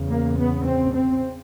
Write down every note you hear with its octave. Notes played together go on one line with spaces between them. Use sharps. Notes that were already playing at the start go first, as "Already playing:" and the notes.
Already playing: E2 C#3
A#3
B3
C4
C4